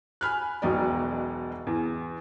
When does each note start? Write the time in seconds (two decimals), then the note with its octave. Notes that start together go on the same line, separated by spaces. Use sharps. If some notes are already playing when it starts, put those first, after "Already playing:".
0.21 G#5 B5 F6 F#6
0.62 E1 B1 B2 D#4 D5
1.67 E2